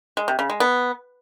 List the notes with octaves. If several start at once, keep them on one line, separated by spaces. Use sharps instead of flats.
G#3
C3
C#3
G#3
B3